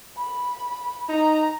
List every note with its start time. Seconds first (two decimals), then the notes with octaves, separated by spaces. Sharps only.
0.17 B5
1.09 D#4 A#5